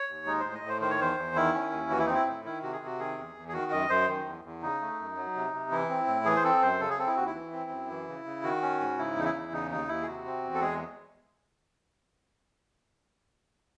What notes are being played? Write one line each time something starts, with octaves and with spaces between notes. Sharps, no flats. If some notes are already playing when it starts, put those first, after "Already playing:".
Already playing: C#5
D#2
G#3 D#4
A2 C5
D#5
A2
C5
D#3 C5
C#5
E2 C5
E2
D#3 E4
C#4
D#2
E3 F#4
E4
C4 D#4
E4
A2
D#3 E4
C3 F#4
G#4
C3
F#4
D#3 G#4
E2
E2
G#4
D#3 F#4
F#2 D#5
F#2 C5
D#3
E2
E2
C#3 D#4
A3
F#2
F#3
C3
C3
E3 E4
C4
A2
E3 G#4
C5
C4 A4
F#2 C5
C#3 A4
G#4
C4 A4
E4
D#2 F#4
E4
E3
C4
F#2
E3
C#3
C#3
D#3 F#4
C#4
G#2
C#3 E4
E2 D#4
E4
E2
C#3 D#4
D#2 D#4
D#2 E4
G#4
C3 F#4
C4
E2
A4
G#3 G#4